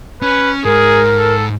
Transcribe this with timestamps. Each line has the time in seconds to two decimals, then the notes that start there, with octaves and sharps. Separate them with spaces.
0.22 C#4 B4
0.65 G#2 G#4 A#4
1.17 A4